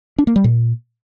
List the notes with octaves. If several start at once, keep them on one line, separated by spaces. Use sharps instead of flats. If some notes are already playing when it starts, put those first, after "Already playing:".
D4
A#3
G3
A#2